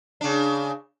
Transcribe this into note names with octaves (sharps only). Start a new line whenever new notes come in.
C#3 D4